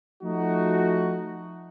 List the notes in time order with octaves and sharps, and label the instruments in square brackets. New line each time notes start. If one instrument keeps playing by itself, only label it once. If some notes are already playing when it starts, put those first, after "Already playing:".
[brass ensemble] F3 A3 D#4 F#4